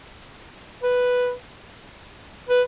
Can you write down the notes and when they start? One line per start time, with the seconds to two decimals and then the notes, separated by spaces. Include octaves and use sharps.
0.83 B4
2.49 B4